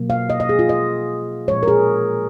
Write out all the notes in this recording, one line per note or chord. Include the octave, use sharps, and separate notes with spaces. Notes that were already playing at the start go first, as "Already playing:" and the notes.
Already playing: B2 F#3 A#3
F5
D#5
D#5
G#4
F4
D#5
A#2 F3 G#3 C#5
A#4
G#4